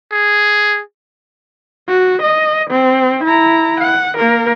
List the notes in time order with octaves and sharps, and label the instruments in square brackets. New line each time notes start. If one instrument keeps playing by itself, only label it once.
[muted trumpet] G#4
[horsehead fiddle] F#4
D#5
C4
E4 A#5
F#5
A#3 A#4